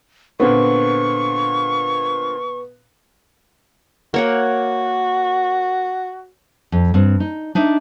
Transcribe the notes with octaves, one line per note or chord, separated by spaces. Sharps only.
A#2 D3 B3 C4 C#6
A#3 F#4 C#5 F#5
F2
G2 C4
D#4
D4 D#4 E5